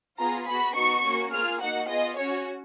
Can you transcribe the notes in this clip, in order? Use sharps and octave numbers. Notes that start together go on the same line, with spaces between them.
B3 F4 G#4 A#5
B3 F#4 B5
B3 D#4 F#4 C#6
A#3 C#4 F#4
A#3 F4 G#4 F6
A#3 D#4 F#4 F#5
B3 F4 G#4 D#5
C#4 F#4 C#5